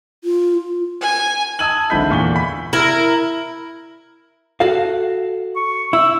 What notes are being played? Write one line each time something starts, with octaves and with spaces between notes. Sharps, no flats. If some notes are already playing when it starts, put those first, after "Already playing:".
F4
G#5
A5 D#6 E6 G#6 D#7 F#7
G#1 D3 E4 B5 G6 B6
E2 A#2 C#6 G7
B5 B6
E4 A#4
F#4 A4 F5
C#6
E4 E6